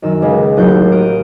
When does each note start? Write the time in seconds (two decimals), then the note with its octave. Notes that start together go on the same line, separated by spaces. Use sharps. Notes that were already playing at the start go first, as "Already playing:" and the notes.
0.02 F#2 D#3 E6
0.22 C#2 C#3 G#3
0.57 A1 D#2 F#3 F#6 G6
0.92 D#6 F6 G6 D7 D#7